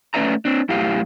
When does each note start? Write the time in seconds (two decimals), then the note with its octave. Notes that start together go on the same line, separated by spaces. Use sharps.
0.14 A3 C#4 B4 D5 E5 A#5
0.45 C4 D4
0.69 F#2 A2 E4 G4 F5